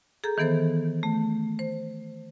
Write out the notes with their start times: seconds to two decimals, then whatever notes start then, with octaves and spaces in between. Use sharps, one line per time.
0.24 G#4 A4 A#5 G6
0.38 D#3 E3 B3 A4 C5
1.03 A3
1.59 C5